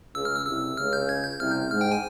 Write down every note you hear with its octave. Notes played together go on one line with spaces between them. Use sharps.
C#2 C#3 E6
F6
E6
C2 C3 E6
C#2 C#3 F6
G6
G#6
G6
C2 C3 F6
G6
G6
G#2 F6
G5
G#5